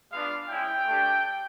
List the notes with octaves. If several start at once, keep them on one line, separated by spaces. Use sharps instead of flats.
G#3 B3 D4 F4 F5
G#3 C#4 E4 G5
A3 D4 G4